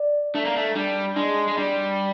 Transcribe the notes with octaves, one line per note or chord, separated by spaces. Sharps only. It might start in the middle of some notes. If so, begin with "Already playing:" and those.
Already playing: D5
A3 D4
A#3
A3
G3 D4
G#3 D4
G#3
G3 D4